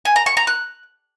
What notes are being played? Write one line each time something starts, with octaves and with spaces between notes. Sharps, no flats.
G#5
A#5
C#6
A#5
F#6